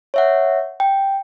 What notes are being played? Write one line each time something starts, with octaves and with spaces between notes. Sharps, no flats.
C#5 E5 F#5
G5